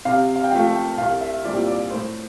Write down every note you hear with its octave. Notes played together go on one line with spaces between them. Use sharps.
C3 F5
F5
G5
F3 A3 F5
G5
C2 F5
E5
A#2 G3 C4 E4 D5
D5
A2 C5